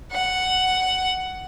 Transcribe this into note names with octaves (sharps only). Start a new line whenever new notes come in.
F#5